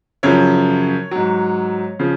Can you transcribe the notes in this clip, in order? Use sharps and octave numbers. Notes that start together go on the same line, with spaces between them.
F#2 C#3 F3 C#5
G#2 F#3
C#3 F3